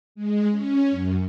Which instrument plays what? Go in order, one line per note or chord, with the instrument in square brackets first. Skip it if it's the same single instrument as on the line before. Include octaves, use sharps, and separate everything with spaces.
[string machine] G#3
C#4
F#2